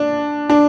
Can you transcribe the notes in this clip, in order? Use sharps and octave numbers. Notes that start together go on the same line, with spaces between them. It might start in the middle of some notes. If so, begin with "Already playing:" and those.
Already playing: D4
D4